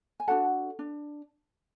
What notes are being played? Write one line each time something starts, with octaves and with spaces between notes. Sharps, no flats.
G#5
D4 F#4 A4 F#5 A5
D4